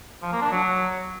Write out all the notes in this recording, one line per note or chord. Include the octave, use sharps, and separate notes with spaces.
F3
A#3
D4
F#3